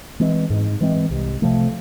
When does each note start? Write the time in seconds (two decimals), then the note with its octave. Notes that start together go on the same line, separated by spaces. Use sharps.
0.20 E3 G#3 C4
0.50 G#2
0.81 E3 G#3 C4
1.11 C2
1.42 C3 F3 A3